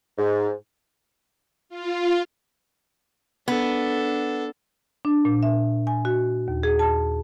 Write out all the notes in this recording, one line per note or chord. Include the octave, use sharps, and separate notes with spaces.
G#2
F4
B3 D4 A4
D4
A#2
E5
G#5
F#4
D#2
G#4
A5